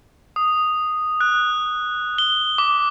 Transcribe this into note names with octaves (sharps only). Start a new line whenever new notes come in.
D#6
F#6
G7
D6